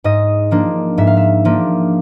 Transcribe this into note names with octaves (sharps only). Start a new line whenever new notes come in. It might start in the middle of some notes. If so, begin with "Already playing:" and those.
G#2 D#5
F3 A#3 D4
G#2 E5
F5
E5
F3 A#3 D4